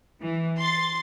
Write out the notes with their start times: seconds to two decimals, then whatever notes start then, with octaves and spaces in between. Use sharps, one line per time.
0.20 E3
0.59 C6 A6